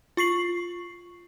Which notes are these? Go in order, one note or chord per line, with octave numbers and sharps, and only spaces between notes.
F4 C#6 C7 F#7